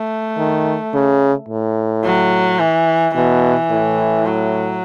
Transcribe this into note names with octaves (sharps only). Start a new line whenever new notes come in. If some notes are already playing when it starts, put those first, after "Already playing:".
Already playing: A3
D#3
C#3
A2
F#3
E3
B2 E3
A2
F#3